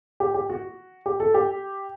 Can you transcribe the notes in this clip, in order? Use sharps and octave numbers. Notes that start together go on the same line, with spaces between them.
G4
G4
F#4
G4
A4
G4